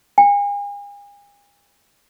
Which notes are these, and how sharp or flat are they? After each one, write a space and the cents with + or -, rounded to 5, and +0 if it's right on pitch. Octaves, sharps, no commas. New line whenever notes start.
G#5 -40